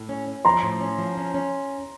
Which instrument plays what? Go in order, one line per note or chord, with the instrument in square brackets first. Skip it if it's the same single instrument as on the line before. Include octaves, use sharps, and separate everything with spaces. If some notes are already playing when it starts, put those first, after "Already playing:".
Already playing: [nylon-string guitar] A2
C#4
C#4
[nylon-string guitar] F3 [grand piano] A#5 C6
[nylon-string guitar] A2
C#4
F3
C#4
C#4